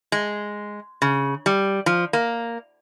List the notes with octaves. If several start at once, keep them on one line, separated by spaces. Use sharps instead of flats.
G#3
C#3
G3
F3
A#3